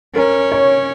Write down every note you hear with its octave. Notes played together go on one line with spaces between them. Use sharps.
C#4 A#4
C#5